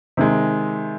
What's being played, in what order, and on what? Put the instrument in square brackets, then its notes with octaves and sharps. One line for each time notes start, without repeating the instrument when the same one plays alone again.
[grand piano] C3 D#3 G#3